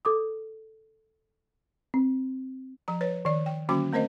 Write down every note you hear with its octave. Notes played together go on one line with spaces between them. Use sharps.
A4 D6 D#6
C4
F3 A#5
B4 C#5
D#3 D5
G5
D3 F#3 A#3 C#4 F#4 D6
A3 C4 A#4 C5 D#5